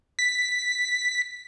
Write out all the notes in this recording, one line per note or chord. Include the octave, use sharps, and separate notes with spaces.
B6